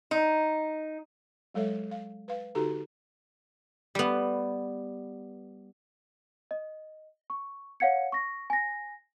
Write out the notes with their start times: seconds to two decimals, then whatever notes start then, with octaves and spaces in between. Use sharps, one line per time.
0.11 D#4
1.54 F#3 G#3 A4 C#5 E5
1.91 F5
2.28 B4 F5
2.55 D3 D#4 F#4 G4 A4 A#5
3.95 G3 B3
6.51 D#5
7.30 C#6
7.80 C#5 F5 F#5 G#6 C#7
8.12 C#6 A#6
8.50 G#5 A#6